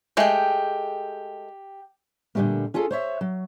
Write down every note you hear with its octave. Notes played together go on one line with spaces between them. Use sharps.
G#3 A3 G4 G5
A#2 D3 E3 G3 A3 A#3
C#4 F4 G#4 A4
C5 C#5 E5
F#3